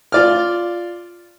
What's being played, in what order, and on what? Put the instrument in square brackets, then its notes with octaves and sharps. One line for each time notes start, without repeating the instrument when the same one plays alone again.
[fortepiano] F4 D5 F6